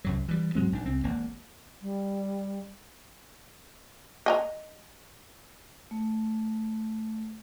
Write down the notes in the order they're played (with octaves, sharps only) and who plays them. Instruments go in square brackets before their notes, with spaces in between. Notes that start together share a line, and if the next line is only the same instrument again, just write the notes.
[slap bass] C2 F#2 F#3
E3 G3
G#2 F#3 G#3 C4
A#1 D4
C2 C4
G#1 A#3
[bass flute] G3
[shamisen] D#5 G#5 A#5
[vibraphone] A3